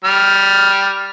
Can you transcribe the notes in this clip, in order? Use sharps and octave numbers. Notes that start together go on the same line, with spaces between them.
G3 F6